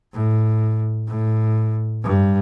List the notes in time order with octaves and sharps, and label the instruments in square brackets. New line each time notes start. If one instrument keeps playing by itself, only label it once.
[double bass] A2
A2
G2